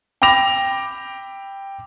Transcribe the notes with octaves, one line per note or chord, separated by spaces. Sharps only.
G5 B5 D6 A#6 F7